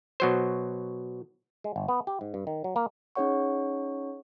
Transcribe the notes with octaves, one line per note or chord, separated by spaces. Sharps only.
B2 F#3 C5
G#3
G1
B3
G4
G#2
G2
D#3
F#3
A#3
C#4 D#4 G#4 C#5 F#5 C#6